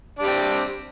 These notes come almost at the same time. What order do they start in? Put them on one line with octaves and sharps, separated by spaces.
D4 G3 C4